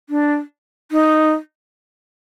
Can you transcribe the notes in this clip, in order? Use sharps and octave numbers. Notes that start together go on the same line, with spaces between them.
D4
D#4